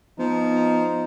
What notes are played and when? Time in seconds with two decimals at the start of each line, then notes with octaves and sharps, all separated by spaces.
0.19 F3 B3 D#4